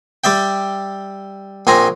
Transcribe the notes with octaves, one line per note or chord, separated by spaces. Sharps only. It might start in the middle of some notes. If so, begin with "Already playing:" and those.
G3 D5 E5 G5
A#1 C4 G#5 A#5